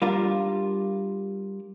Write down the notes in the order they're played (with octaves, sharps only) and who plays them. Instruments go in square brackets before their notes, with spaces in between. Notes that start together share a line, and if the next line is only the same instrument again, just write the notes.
[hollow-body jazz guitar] G3 D4 F4 A#4